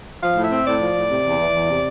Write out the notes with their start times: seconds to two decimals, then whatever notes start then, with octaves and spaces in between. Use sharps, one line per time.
0.22 F3 F5
0.36 A2
0.44 E5
0.51 C4
0.66 A2 D5
0.80 F3
0.96 A2
1.11 C3
1.25 E2
1.39 E3
1.54 E2
1.69 C3